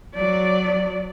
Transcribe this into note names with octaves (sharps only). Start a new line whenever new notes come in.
F#3 D5